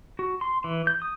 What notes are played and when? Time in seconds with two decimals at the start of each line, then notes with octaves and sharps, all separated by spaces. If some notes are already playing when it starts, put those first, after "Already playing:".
0.19 F#4
0.41 C6
0.64 E3
0.87 G6
1.02 D#6